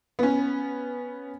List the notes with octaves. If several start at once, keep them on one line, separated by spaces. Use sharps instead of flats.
B3 C#4